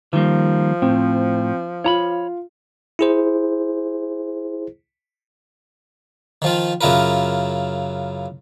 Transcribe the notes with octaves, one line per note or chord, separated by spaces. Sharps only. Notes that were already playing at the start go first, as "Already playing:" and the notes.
D#3 F3 G3 A#3
A2 C4
F4 C#5 A#5 B5
E4 G#4 C5
D#3 F3 F4
F#2 C#3 E4 F4 A#4 B4